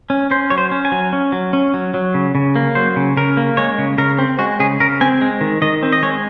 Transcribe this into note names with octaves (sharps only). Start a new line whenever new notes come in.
C#4
C#4 C5
F#3 C#5
C5
C#4
G#5
F#3
C#4
F#3
C#4
F#3
F#3
C#3
C#3
A#3
F#3 C5
C#3
C#3 A#4
A#3
G#3 C#5
C#3
C#3 A#4
C4
G#3 F#4
C#3 G#4
C#3 A#4
C4 G#5
G#3
D#3
D#3 D#5
C4
D#5
G#3 C#5